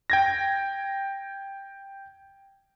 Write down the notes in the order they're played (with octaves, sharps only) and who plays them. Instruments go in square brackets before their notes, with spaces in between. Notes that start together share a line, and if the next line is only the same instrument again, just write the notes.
[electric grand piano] G5 G#6 A#6